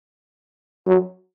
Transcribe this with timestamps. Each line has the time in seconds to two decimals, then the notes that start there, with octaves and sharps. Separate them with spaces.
0.87 F#3